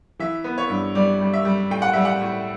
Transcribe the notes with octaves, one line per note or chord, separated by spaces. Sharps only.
E3 E5
B3
C#5
G2
G3 D5
G3
E5
G3
A2 G5
F#5
G3 E5
F#5
A2